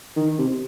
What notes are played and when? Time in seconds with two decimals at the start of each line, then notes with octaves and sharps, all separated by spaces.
0.16 D#3
0.39 C3